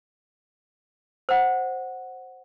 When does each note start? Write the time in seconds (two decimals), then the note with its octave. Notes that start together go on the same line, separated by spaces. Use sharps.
1.29 C5 F#5